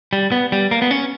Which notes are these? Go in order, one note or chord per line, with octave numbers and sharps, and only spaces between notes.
G3
B3
G3
A#3
B3
C#4